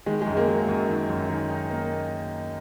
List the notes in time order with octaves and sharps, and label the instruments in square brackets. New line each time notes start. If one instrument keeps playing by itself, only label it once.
[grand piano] D#3 [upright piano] G#3
[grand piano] F#2 [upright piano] G#3
[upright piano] A#3
[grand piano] F#3
F#2
D#3
F#2
D#3
D#4
A#3